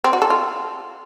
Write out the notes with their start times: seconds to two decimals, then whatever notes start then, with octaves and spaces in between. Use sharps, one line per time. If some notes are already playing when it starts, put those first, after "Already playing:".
0.04 C4
0.13 F#4
0.22 A4
0.30 F4